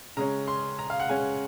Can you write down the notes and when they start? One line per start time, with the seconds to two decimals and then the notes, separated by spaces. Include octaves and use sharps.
0.17 C#3 G#3 C#4 A#5
0.48 C6
0.79 A#5
0.90 F5
1.00 F#5
1.09 C#3 G#3 C#4 G#5